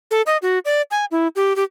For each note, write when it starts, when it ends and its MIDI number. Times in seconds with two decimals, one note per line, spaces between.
0.11 0.22 69
0.26 0.37 75
0.42 0.59 66
0.65 0.82 74
0.91 1.05 80
1.11 1.27 64
1.36 1.56 67
1.56 1.64 67